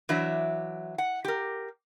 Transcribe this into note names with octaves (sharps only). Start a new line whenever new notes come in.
E3 F#3 D4 E5
F#5
G4 A#4